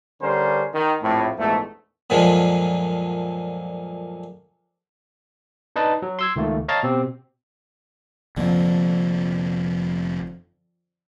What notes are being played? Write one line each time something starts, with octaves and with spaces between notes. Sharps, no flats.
D3 G3 C#4 A#4 C5
D#3
A#1 F2 A2
A#1 E2 G#2 A3
F#2 A#2 D3 F3 G#3
D4 D#4 B4 D#5 A5
F#3
C6 E6 G#6
C#2 D#3 A3 A#3
C#5 D#5 F5 A5 A#5 A6
B2 C4 G4
F1 F2 D3 F3 A#3